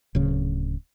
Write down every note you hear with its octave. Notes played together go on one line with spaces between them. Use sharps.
D1 C#3